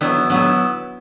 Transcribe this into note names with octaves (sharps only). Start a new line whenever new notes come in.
F#3 B3 E4
F#3 B3 E4